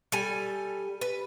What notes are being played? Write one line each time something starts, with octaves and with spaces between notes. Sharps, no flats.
G3 A4 G#5
B4